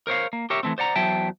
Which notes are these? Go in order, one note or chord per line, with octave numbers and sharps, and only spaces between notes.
A#4 C5 C#5 F5
A#3
G4 A#4 C#5 E5
E3 A3 C4
C5 D5 F#5 A#5
E2 F#3 C5 E5 G5 A5